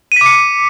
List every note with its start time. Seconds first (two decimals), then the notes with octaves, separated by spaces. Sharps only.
0.12 D#7
0.16 B6
0.21 D6
0.26 C#7